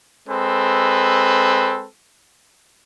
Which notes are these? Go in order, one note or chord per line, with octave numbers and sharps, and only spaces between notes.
G#3 C4 A4 B4